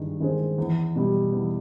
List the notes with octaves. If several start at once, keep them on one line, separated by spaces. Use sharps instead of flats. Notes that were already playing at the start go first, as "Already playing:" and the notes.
Already playing: G2 D#3 G#3
D#3 G#3 C4
E2
B2 G3
E2